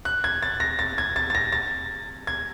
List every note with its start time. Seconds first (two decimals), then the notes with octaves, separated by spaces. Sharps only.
0.05 F#6
0.24 G#6
0.43 A6
0.60 A#6
0.79 A6
0.98 G#6
1.16 A6
1.30 A6
1.35 A#6
1.52 A6
2.27 G#6